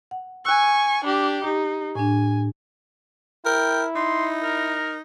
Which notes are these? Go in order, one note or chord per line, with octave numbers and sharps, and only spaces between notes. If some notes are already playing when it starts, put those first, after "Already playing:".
F#5
G#5 C#6 E6 F#6
D4 G4
D#4 G4
A2 D4 G#5
E4 A#4 G5
D#4 C6
A#4